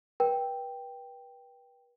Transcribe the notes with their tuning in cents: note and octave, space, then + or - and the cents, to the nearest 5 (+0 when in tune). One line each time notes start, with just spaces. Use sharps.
B4 -35 G5 +0